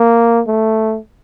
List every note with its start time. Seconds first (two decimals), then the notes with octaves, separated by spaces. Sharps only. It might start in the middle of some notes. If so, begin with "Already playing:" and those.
Already playing: A#3
0.47 A3